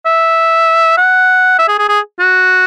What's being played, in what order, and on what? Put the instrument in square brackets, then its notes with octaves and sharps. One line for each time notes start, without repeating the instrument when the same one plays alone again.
[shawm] E5
F#5
E5
G#4
G#4
G#4
F#4